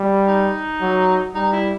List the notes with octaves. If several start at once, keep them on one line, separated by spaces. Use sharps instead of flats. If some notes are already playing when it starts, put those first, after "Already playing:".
Already playing: G3
D#4
F#3
G3 D#4
E4